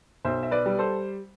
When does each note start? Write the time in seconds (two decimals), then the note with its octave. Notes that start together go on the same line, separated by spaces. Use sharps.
0.25 B1 C5 E5
0.43 E5
0.51 B4 D5
0.66 G3
0.79 A4 C5